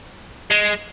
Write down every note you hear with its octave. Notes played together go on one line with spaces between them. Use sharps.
G#3